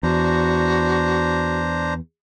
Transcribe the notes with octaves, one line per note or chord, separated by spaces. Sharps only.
E2 D4 F#4 C5 A#5